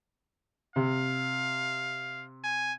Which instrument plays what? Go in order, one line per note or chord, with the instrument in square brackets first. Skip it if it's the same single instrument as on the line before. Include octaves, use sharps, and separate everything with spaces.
[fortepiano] C3 [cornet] F5
[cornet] G#5